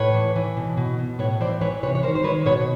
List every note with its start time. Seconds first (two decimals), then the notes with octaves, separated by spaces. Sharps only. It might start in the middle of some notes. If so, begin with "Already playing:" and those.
Already playing: A2 B4 C#5
0.14 E3
0.36 E3
0.57 B2
0.77 B2
0.99 B2
1.19 A2 B4 C#5
1.41 E3 C5 D5
1.61 E3 B4 C#5
1.83 C3 B4 C#5
1.95 C#5
2.03 D#3 A#4 C5
2.15 C5
2.24 D#3 B4 C#5
2.46 B2 B4 C#5